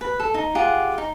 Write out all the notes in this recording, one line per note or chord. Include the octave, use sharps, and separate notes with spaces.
B4
A4
D#4
F4 G4 G#4 F#5
D#4